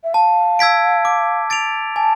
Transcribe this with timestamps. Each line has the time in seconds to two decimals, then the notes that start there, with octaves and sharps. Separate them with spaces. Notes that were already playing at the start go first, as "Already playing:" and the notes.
0.04 E5
0.14 F5 A5
0.59 E6 G#6 B6 D7
1.05 D6
1.50 A6 D7 F7
1.95 G#5 A5